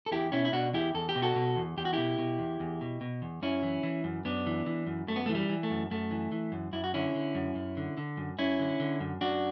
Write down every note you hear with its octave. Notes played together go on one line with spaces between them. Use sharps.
A4
E2 E4 G4
B2 C#4 E4
E4
B2 D4 F#4
E2 E4 G4
E2 A4
G4
B2
F#4 A4
B2
E2
E2 G4
F#4
B2 E4 G4
B2
E2
E2
B2
B2
E2
F#2 C#4 E4
E3
E3
F#2
F#2 B3 D4
E3
E3
F#2
F#2 A3
B3
A3
E3
G3
E3
A3
F#2
F#2 A3
E3
E3
F#2
F#2 E4
F#4
D3 C#4 E4
D3
F#2
F#2
D3
D3
F#2
F#2 C#4 E4
D3
D3
F#2
F#2 D4 F#4